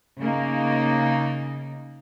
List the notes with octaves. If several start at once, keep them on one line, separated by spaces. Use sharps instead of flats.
C#3 A#3 D#4